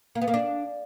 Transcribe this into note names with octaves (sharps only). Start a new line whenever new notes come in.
A#3
B3
A#3
D4